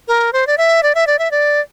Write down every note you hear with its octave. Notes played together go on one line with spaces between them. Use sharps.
A#4
C5
D5
E5
D5
E5
D5
E5
D5